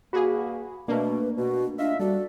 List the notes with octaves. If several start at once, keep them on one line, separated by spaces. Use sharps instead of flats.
G2 A#3 F#4 G#4 B5
B2 A3 A#3 D4 B4
B2 F#4
D4 F4 D#5 E5
G3 D4 F#4 A4